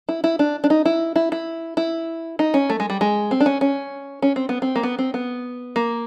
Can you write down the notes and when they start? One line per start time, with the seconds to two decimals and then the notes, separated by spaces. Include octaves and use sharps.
0.09 E4
0.24 E4
0.39 D4
0.64 D4
0.70 D#4
0.85 E4
1.16 E4
1.32 E4
1.77 E4
2.39 D#4
2.54 C#4
2.70 A3
2.80 G#3
2.90 G3
3.01 G#3
3.31 C4
3.40 D4
3.46 C#4
3.61 C#4
4.22 C#4
4.36 C4
4.49 B3
4.62 C4
4.76 A#3
4.83 B3
4.98 C4
5.14 B3
5.76 A#3